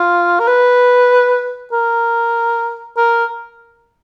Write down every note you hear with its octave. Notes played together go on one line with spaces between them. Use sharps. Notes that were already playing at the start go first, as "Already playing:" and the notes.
Already playing: F4
A#4
B4
A#4
A#4